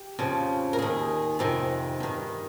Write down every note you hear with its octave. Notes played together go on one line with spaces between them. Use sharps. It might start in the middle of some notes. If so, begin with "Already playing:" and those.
Already playing: G4
F2 C#3 F3
A#4
D#2 D#3 G#4
F2 C3 D#3
G2 D#3